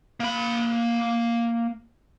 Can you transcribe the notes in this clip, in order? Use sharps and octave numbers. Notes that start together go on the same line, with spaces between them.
A#3 B5